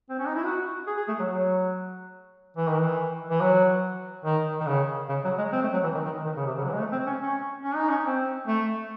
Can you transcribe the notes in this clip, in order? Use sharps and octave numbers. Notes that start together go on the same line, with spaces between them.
C4
C#4
D#4
E4
F#4
G#4
G#4
A3
F#3
F#3
E3
D#3
E3
E3
F#3
D#3
D#3
C#3
C#3
F#3
G#3
C4
A3
F#3
E3
D#3
D#3
D#3
C#3
C3
C#3
F#3
E3
G#3
A3
C4
C#4
C#4
C#4
D#4
C#4
C4
A3